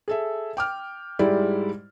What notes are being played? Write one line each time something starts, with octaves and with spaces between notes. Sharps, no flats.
G#4 A4 E5
G5 D6 F6
G#2 G3 G#3 E4 G4 D5